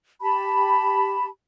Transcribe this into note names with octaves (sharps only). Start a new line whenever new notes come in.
G4 A5 B5